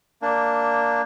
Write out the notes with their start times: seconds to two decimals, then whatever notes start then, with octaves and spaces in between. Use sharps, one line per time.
0.22 A#3 D4